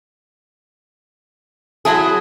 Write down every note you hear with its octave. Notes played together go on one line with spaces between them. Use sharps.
F#3 E4 G#4 A5